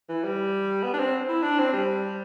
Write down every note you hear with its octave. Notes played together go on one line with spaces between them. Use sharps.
E3
G3
B3
D4
C4
E4
D4
C4
G3